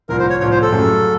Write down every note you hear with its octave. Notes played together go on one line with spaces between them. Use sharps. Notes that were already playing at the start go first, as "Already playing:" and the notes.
C2 A#2 F3 A#4
C5
C#5
C2 A#2 F3 C#5
C5
A4
F#2 C#3 A3